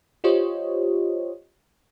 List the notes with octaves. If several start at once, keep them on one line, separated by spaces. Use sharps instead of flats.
F4 G4 C5 C#5 D#5